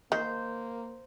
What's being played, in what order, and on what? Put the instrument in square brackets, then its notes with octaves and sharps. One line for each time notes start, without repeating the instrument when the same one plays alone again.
[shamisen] D#3 [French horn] A#3 [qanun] C5